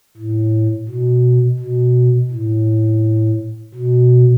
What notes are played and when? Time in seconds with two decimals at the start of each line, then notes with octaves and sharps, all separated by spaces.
0.17 A2
0.89 B2
1.59 B2
2.31 A2
3.75 B2